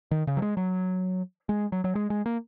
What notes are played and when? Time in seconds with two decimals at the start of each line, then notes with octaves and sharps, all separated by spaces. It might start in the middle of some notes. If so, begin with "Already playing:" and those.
0.11 D#3
0.27 C#3
0.37 F#3
0.42 G#3
0.57 F#3
1.49 G#3
1.72 F#3
1.84 F#3
1.95 G#3
2.10 G#3
2.26 A#3